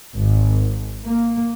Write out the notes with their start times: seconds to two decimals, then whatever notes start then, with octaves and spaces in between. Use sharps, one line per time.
0.15 G#1
1.05 A#3